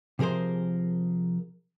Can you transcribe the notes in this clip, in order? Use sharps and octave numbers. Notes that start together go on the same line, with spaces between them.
C3 F3 G#4 A#4 C5